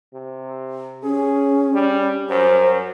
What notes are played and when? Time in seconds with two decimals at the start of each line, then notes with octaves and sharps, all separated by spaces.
0.14 C3
1.03 C#4 G#4
1.74 G3
2.30 F#2 C5